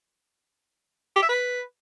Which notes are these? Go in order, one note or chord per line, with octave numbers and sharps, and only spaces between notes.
G4
E5
B4